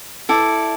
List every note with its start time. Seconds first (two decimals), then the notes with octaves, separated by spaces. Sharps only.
0.29 E4 A4 D5